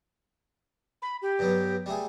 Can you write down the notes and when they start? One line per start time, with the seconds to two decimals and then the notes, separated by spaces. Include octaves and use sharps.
1.02 B5
1.22 G4
1.39 G2 F#3 B3
1.86 G3 A3 G#4